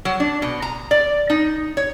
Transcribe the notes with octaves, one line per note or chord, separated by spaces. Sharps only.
F#3
D4
B2
A#5
D5
D#4
C#5